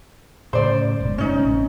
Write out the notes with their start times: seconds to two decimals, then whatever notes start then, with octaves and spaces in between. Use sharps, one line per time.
0.53 A2 C#3 C5 D5
1.00 F#1 G#2 B2
1.18 C#4 D#4
1.42 A1 C4